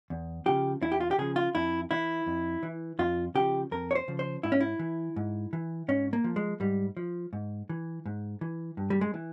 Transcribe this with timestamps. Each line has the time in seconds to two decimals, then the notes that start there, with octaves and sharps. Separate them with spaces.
0.10 E2
0.46 C#3 F3 G4
0.82 E2 E4
0.92 G4
1.00 F4
1.11 G4
1.18 C#3 F3 G#4
1.36 F4
1.55 F2 E4
1.91 E3 E4
2.26 F2
2.63 E3
2.99 F2 F4
3.35 C#3 F3 G4
3.71 F2 A#4
3.91 C#5
3.95 C5
4.08 C#3 F3
4.19 C5
4.43 G#2 E4
4.52 C#4
4.60 E4
4.79 E3
5.16 G#2
5.53 E3
5.88 G#2 C#4
6.13 A#3
6.24 F3
6.36 G#3
6.60 G#2 G3
6.97 F3
7.33 G#2
7.69 E3
8.06 G#2
8.41 E3
8.77 G2
8.90 G3
9.01 G#3
9.14 E3